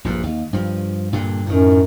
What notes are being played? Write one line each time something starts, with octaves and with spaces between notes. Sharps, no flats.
A#1 G2 A#2
D#2
G2 F3
G2 A#2 D3
F#2 A2 D#3